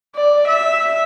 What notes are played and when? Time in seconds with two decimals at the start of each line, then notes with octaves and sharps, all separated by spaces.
0.15 D5
0.48 E5